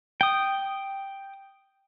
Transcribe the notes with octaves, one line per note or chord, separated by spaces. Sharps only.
G5 D#6